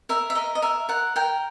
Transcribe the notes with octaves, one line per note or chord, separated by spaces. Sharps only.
A#4 E5
E5
A#4 D#5
D#5
A#4 E5
A#4 F#5
A#4 G5